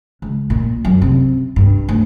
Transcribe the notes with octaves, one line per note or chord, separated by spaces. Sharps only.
C#2
A#2
F#2
C3
G2
D2